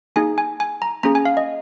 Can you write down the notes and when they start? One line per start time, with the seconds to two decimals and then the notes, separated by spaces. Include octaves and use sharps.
0.16 A#3 D#4 G#4 G#5
0.38 G#5
0.60 G#5
0.82 A#5
1.03 A#3 C#4 G#4 A#5
1.15 G#5
1.25 F5
1.37 D#5